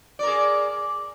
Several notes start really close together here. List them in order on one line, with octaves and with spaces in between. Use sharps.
D5 A#4 G#4